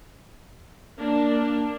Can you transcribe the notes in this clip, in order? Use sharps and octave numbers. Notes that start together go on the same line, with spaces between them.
A#3 D4